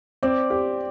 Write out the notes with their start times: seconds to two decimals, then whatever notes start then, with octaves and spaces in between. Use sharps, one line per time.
0.23 C4 D5
0.50 G4